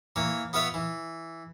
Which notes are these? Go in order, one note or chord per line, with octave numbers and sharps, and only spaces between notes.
E3 A#3 C#5
B3 F4 B4 C#5 E5 F5
E3